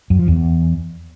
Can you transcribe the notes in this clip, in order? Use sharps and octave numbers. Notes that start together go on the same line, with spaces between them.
F#2
F3
E2